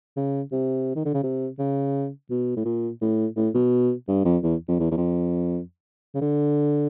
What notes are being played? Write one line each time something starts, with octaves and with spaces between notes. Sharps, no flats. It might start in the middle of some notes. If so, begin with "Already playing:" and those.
C#3
C3
D#3
D3
C#3
C3
C#3
B2
A2
A#2
A2
A2
B2
G2
F2
E2
F2
E2
E2
F2
C#3
D3